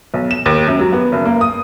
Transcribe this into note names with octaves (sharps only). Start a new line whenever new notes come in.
B1
E7
D#2
F#2
F#3
B3
F#1
A#3
D#6